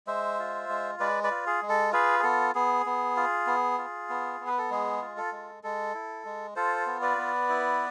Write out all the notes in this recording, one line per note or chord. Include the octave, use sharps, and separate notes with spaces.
G#3 C5 E5
F4
G#3
G#3 B4 D5
B4 D5
F4
G#4
G#3
A4
F4 G#4 B4
G#4
B3 A4
B3 G#4
B3
F4
B3
F4
B3
B3
B4
A4
G#3 G#4
F4
A4
G#3
G#3 A4
E4
G#3
F4 A4 C5
B3
B4 D5
B3
E4